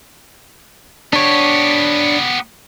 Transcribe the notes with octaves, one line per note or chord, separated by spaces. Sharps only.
B3 D4 G4 C#5